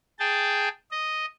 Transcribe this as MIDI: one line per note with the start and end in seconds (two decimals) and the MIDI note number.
0.19 0.68 68
0.19 0.68 79
0.19 0.68 81
0.91 1.25 75